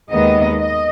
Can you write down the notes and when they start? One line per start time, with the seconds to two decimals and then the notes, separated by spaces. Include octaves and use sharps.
0.11 D#2 D#3 G#3 B3 D#5
0.60 D#5